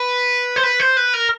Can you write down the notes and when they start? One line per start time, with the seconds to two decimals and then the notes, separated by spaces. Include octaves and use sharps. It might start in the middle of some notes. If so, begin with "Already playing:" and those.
Already playing: B4
0.56 C5
0.63 B4
0.80 C5
0.97 B4
1.14 A#4